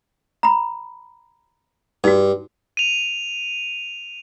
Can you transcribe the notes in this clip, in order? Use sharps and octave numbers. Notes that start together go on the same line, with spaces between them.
A#5 B5
G2 D#4 F#4
D#7 F7